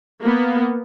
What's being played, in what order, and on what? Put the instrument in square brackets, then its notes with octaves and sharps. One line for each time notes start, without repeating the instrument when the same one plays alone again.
[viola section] A#3 B3